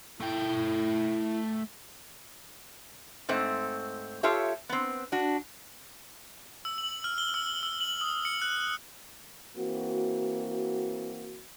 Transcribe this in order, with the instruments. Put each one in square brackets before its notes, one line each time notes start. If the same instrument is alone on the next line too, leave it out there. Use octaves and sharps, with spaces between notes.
[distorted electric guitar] A3 G5 [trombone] E4
[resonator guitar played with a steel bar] G#2 A3 C4
F4 G4 A4 C#5 E5
B3 C4
D4 F#4
[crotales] E6
F#7
F6
G7
E6
E6
F#7
D#6
C#7
F#6
[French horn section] E3 A#3 C4 F#4